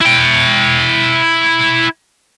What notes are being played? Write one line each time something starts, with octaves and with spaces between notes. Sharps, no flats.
E4 G5